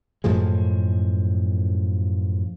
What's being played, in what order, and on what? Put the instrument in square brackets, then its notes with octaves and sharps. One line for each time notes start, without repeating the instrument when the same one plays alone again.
[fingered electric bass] F#2 A2 F3 G#3